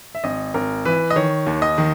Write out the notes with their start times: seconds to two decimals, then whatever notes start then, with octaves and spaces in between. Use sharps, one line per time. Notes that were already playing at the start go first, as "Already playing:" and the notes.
0.15 E5
0.24 G#1 D#5
0.54 G#1 A#4
0.85 E3 B4
1.10 D#5
1.16 D#3 C#5
1.46 D#2
1.62 D#5
1.78 D#3